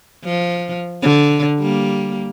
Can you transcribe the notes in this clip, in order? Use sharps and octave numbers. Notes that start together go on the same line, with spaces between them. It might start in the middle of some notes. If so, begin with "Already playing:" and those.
F3
D3
G3 A#3